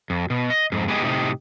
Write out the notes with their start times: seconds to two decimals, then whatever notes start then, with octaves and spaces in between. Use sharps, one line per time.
0.10 F2
0.30 B2
0.50 D#5
0.72 F2 G#2
0.88 G#3 B3 D#4 G4 G#4 D#5
1.02 A2 C3 D#4 G4